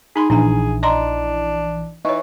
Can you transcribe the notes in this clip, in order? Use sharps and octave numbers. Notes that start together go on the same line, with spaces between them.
D#4 G#4 B5 C6
A#1 E3 D4 E4 G#4 G#5
D4 D#5 A#5 C6
E3 D#4 C#5 C#6